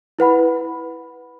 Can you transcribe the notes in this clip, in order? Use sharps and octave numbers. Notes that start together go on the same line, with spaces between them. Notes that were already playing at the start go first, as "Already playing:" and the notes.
E4 B4 F#5 B5